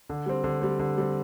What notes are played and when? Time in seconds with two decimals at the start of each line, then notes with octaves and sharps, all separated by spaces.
0.10 D3
0.26 G3 C4
0.44 D3
0.61 G3 C4
0.79 D3
0.98 G3 C4